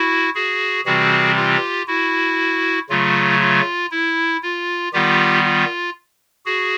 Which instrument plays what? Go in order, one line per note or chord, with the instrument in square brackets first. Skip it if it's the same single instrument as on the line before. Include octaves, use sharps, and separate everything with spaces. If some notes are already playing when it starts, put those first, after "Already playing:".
Already playing: [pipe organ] E4 F#4
F#4 G#4
C3 E3 G3 C4 F#4 G#4
F4 G4
E4 F#4
C#3 F#3 A3 F4
F4
E4
F4
D#3 G3 B3 F4 G4
F4
F#4 G#4